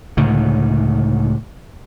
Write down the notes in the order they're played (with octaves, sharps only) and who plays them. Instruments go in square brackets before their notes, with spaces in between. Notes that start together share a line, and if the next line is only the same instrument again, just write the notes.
[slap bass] C#2 A2 D3 D#3